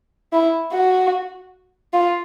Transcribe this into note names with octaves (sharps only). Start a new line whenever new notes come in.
E4
F#4
F4